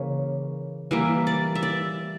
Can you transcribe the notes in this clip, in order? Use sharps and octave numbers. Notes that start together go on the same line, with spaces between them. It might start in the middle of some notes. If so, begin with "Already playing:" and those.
Already playing: C#3 E3 A#3 C#5
E3 G3 A#3 E5
D5
E5
D5